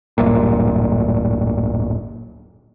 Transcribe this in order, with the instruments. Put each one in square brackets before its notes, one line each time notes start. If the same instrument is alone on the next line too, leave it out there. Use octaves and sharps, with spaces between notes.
[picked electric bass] D1 G1 A#2